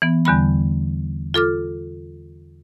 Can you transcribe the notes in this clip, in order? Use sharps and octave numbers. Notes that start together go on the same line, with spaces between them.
E3 B3
E2 D3 G3 B5
F4 A4 D6 F6